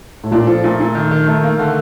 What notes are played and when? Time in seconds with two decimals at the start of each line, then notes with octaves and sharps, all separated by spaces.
0.24 A2
0.32 A#2 D4
0.47 F3 A4
0.64 A#2 A3
0.80 A#2
0.95 D#3
1.11 D#3
1.27 D#3 A3
1.43 A#3
1.59 D3 A3